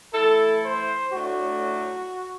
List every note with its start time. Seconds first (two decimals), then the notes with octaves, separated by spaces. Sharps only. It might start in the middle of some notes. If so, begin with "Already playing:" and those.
0.14 E3 A3 E4 A4
0.64 C5
1.13 A2 F#3 A3 D4 F#4